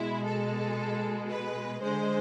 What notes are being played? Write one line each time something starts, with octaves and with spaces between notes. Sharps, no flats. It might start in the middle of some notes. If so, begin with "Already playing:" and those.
Already playing: B2 G#3 E4
A4
B4
D3 G#3 C5